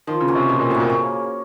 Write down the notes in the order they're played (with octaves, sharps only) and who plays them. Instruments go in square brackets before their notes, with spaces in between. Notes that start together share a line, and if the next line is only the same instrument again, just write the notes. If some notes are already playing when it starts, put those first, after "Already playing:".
[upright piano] D#3 [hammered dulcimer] F3
[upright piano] C#3
[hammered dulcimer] A#3 C#4 F#4
[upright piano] C3
[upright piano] B2 [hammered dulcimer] F3
[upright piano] A#2
[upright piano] A2 [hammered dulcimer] A#3 C#4 F#4
[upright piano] A#2
[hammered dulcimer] C#3